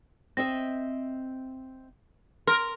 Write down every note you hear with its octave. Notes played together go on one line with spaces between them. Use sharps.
C4 D#5 E5 A#6
A#4 C6 A#6